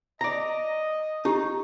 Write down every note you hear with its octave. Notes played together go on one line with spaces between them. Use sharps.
D5 D#5 A#5
D#4 E4 G4